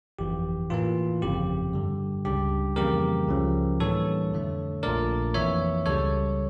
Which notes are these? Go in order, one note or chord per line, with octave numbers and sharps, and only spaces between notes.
G1 F2 E3 G4
A2 E3 A#3 F4
G1 F2 C#3 G4
G2 D3 G3
C#2 C#3 G3 D4 G4
F2 C#3 E3 G3 A#3 G4 A#4
C#2 C#3 F3 C#4
A2 E3 G3 A#3 D4 A4 C#5
F2 D3 A3 D4
A#1 A#2 A3 D4 A#4 D5
F2 E3 A#3 C#5 E5
C#2 C#3 G3 A4 C#5